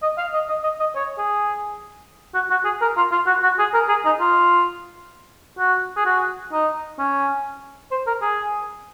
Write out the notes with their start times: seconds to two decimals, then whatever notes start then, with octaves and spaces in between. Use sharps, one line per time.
0.02 D#5
0.18 F5
0.33 D#5
0.49 D#5
0.63 D#5
0.80 D#5
0.95 C#5
1.18 G#4
2.34 F#4
2.50 F#4
2.65 G#4
2.81 A#4
2.97 F4
3.12 F4
3.27 F#4
3.43 F#4
3.59 G#4
3.74 A#4
3.88 G#4
4.05 D#4
4.20 F4
5.59 F#4
5.97 G#4
6.06 F#4
6.52 D#4
6.99 C#4
7.91 C5
8.07 A#4
8.22 G#4